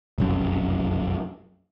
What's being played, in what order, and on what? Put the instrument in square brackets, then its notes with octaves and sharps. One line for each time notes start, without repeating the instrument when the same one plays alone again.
[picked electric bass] F1 B1 F#2